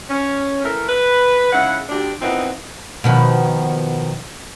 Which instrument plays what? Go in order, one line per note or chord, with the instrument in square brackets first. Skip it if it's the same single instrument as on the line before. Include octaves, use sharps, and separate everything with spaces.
[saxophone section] C#4
E3 A3 A4 A#4
B4
G#2 C#3 E4 F#5
D2 D4 G4
F2 A#2 B3 C4 D#4 E4
[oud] B2 D#3 F3